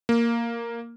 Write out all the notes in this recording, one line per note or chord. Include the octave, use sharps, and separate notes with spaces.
A#3